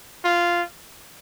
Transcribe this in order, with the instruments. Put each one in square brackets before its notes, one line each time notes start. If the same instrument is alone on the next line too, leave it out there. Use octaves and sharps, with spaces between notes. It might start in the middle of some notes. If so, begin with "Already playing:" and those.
[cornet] F4